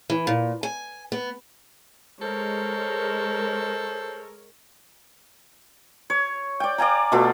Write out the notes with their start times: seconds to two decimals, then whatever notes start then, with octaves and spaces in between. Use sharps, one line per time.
0.10 E3
0.27 A#2
0.63 G#5
1.12 B3
2.22 G#3 A4 A#4 C5 C#5
6.10 C#5
6.60 D5 G5
6.78 D5 F5 G#5 A#5
7.12 B2 A3 F4 F#4